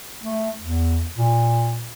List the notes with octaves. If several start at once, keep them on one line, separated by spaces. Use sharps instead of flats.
A3
E2
A#2